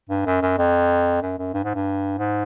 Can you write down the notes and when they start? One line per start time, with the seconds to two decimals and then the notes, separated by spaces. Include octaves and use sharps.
0.10 G2
0.26 F#2
0.42 F#2
0.58 F2
1.22 F#2
1.38 F#2
1.54 G2
1.64 G#2
1.75 G2
2.18 G#2